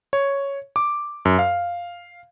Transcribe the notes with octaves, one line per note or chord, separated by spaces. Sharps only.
C#5
D6
F#2
F5